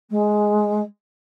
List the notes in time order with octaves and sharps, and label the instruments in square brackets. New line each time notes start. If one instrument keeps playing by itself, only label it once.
[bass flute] G#3